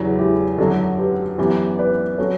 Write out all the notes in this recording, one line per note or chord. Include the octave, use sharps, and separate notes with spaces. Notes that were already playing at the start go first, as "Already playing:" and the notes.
Already playing: E2 C#3 F#3 B3 E4 G4
E4 G4
F#2 D3 F#3 F#4 A4
G4 B4
F#2 E3 B3 G4 B4
B4 D5
F#3 C#4 F#4 A4 C#5